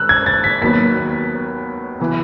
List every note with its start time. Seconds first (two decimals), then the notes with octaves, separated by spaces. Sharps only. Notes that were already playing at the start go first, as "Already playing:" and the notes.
Already playing: D#3 G#3 E6 F#6
0.09 G#6
0.26 A6
0.44 B6
0.61 D#2 D#3 F#3 B3 B6
1.99 E3 B3